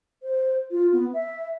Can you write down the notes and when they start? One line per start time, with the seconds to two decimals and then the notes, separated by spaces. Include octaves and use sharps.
0.22 C5
0.71 F4
0.92 B3
1.13 E5